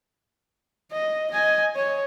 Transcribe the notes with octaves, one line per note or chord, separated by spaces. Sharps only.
D#5
D#5 G#5
C#5